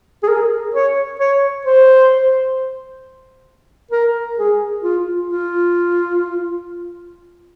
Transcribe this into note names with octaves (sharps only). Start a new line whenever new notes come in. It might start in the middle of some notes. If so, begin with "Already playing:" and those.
G#4
A#4
C#5
C#5
C5
A#4
G#4
F4
F4